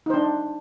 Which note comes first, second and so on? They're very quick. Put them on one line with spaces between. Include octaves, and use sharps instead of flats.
D#4 C5 D4